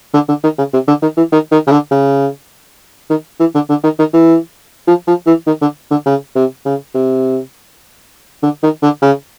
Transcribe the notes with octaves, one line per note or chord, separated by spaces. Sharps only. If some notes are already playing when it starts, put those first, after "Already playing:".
D3
D3
D#3
C#3
C3
D3
D#3
E3
D#3
D#3
C#3
D3
C#3
D#3
E3
D3
D3
D#3
D#3
E3
F3
F3
E3
D#3
D3
D3
C#3
C3
C#3
C3
D3
D#3
D3
C#3